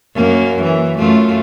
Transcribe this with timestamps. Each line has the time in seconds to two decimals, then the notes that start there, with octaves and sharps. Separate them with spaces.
0.15 F#2 A#3
0.63 E3
0.98 F#2 A3 F4